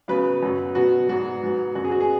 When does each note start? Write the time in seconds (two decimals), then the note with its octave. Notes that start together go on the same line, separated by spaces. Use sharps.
0.08 C#3 F#3 B3 B4
0.43 F#2 F#3 B3
0.75 B2 F#3 B3 F#4
1.08 G#2 F#3 B3 F#4
1.43 G#2 F#3 B3
1.75 F#2 F#3 B3 F#4
1.84 G#4
1.91 F#4
2.00 G#4